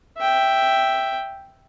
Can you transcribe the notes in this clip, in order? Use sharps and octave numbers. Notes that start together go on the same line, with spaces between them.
E5 G5